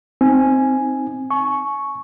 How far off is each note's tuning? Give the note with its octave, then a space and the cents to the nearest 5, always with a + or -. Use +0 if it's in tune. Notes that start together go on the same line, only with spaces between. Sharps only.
C4 +0 D#4 +0 G#5 +0
G#5 +40 C#6 +0